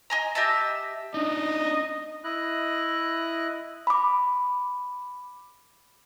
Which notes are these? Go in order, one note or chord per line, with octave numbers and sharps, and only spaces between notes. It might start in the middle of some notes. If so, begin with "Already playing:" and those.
D#5 G#5 A#5
G4 D#5 E5 A5
D4 D#4 D#5
E4 D#5 F#6
B5 D6